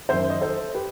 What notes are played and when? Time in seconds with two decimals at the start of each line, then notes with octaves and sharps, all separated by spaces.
0.09 F#2 D#3 C5 E5
0.30 D#5
0.41 A4 C5
0.74 G4 B4